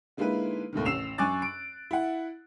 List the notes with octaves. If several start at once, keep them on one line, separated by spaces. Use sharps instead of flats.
D3 G#3 A#3 D#4 E4 B4
D#2 A2 C3 D#3
A1 E6 C7 E7 F7
F#2 G#5 C#6 D6 F#6 A6
D7
E4 F#5